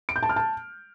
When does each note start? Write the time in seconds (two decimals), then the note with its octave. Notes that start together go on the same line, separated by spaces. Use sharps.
0.09 D7
0.16 G6
0.23 A5
0.29 F6
0.36 A5